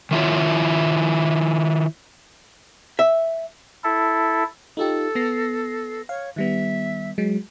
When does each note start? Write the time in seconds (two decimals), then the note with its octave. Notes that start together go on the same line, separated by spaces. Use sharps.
0.11 D#3 E4 F4 C#5
2.99 E5
3.84 E4 A4
4.77 D#4 F4 G4 A4
5.15 B3 A#6 C7
6.09 C#5 F5
6.36 D#3 G3 B3 E5
7.18 F#3 G#3